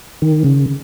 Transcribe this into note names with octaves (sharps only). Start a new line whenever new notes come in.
D#3
C#3